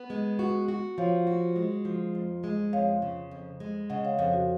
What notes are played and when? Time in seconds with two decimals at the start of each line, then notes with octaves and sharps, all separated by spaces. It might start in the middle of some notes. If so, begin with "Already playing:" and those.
Already playing: B3
0.10 G#3
0.39 F#4
0.68 F#4
0.98 F3 C#5 F5
1.27 F#4
1.56 G#3
1.85 F3
2.15 F2
2.44 G#3
2.73 F2 C#5 F5
3.02 C#3
3.31 F2
3.60 G#3
3.90 C#3 D#5 F#5
4.05 C#5 F5
4.19 F2 C#5 F5
4.33 F#4